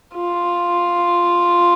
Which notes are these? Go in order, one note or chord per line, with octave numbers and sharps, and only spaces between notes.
F4